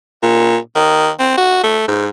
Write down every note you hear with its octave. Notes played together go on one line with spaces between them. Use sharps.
A#2
D#3
C4
F#4
A3
G#2